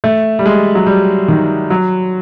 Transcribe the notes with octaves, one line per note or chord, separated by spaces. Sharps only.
A3
G3
G#3
F#3
G3
D#3
F#3